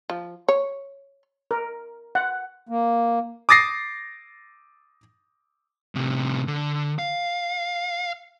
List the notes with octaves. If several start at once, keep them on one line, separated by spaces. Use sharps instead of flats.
F3
C#5
A#4
F#5
A#3
D6 D#6 A6 A#6 C7
A2 C3
D3
F5